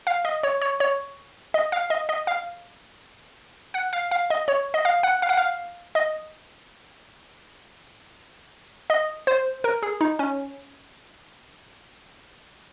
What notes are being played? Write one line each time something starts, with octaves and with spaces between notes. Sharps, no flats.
F5
D#5
C#5
C#5
C#5
D#5
F5
D#5
D#5
F5
F#5
F5
F5
D#5
C#5
D#5
F5
F#5
F5
F#5
F5
D#5
D#5
C5
A#4
G#4
D#4
C#4